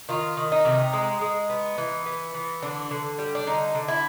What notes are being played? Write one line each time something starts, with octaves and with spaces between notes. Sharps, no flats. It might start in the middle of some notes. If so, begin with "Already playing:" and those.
D#3 F4
D#3
D#4
C3
G#3
G#3
B3
E3
B3
E3
D3 D4
D3
G3
D4
D3 D#4
D3
E4